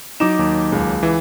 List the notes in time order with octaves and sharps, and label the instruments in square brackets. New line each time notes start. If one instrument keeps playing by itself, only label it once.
[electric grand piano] F#3 D6 E7 [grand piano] D#4
[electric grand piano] D#2 F#3
[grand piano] C#2
[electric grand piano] E3